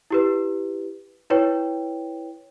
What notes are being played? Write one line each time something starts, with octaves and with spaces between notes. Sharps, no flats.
E4 G4 B4
E4 B4 C#5 G5